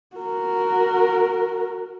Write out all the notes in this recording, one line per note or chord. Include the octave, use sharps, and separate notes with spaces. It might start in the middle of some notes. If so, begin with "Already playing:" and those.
F#4 A#4